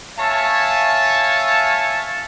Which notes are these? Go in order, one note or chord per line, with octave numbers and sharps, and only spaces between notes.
C#5 E5 F5 G#5 A5